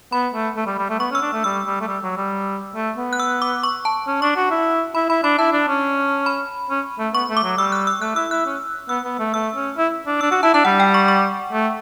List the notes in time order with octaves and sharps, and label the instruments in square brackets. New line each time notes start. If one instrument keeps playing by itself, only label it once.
[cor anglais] B3 [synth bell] B5
[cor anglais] A3
A3
G3
G3
A3
[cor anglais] B3 [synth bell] C#6
[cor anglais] C#4
[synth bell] E6
[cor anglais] D4
A3
[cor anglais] G3 [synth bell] E6
[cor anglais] G3
A3
G3
F#3
G3
A3
B3
[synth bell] F#6
E6
D6
C#6
A5
[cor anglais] C#4
[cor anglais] D4 [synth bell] C#6
[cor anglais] F#4
E4
[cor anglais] E4 [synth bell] B5
[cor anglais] E4 [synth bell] B5
[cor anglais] D4 [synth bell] B5
[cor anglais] E4 [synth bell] A5
[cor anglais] D4
C#4
[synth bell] B5
[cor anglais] C#4
A3
[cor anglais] B3 [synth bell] C#6
[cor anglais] A3
[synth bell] D6
[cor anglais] F#3
[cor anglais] G3 [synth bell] E6
[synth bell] F#6
E6
[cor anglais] A3 [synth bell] F#6
[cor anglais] E4 [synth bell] E6
[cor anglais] E4 [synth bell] F#6
[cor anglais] C#4
[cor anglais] B3 [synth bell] E6
[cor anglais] B3
A3
[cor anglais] A3 [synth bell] E6
[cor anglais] C#4
E4
D4
[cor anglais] D4 [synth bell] E6
[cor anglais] F#4 [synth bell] E6
[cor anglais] E4 [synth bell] A5
[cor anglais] D4 [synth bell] A5
[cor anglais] G3 [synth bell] F#5
[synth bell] G5
C#6
C#6
[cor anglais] A3